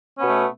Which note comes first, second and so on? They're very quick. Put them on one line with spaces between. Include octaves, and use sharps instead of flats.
C#4 B3 B2 A3